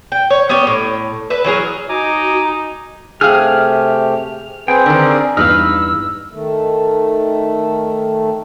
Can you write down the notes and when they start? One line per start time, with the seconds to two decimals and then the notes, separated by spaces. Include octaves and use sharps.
0.12 G5
0.30 C#5
0.49 B3 C#4 G4 C#5
0.67 A2
1.30 B4 E5
1.44 E3 F#3 G#4 A#4
1.89 D#4 F#4 G#5 A#5 D6
3.21 C3 A3 G4 G#4 F5 F6
4.68 C4 G#4 B4 G5
4.86 D3 D#3 A#4 C5 D5
5.37 E2 G2 D#4 B4 D#5 F5 E6 F6
6.32 D#3 A3